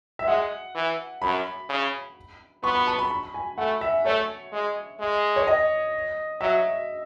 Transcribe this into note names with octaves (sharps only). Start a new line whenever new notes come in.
E5
G#3 F#5
E3
F#2 B5
C#3
B3 C#6
B5
A5
B5
B5
G#5
A3 F#5
E5
A3 C#5
G#3
G#3
C#5
D#5
F#3 E5